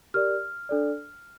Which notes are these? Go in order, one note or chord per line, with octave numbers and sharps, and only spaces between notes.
G4 A#4 D5 F6
D4 A4 D5